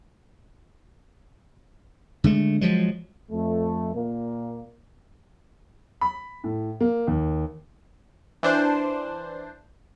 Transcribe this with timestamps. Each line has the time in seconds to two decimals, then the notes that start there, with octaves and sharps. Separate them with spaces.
2.24 D3 G#3 A3
2.61 F3 F#3 G#3
3.32 F2 A3
3.94 A#2 A#3
6.01 B5
6.44 A2
6.80 A#3
7.07 D#2
8.43 E3 D4 C5